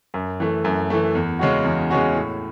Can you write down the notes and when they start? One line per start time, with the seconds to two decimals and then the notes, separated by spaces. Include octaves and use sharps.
0.14 F#2
0.40 E3 A3
0.64 F#2
0.90 E3 A3
1.15 E2
1.39 C#3 G#3 C#4 F#4
1.64 E2
1.90 C#3 G#3 C#4 F#4
2.15 A2